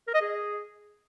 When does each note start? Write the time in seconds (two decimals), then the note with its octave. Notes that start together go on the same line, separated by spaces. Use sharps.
0.07 A#4
0.14 D#5
0.21 G#4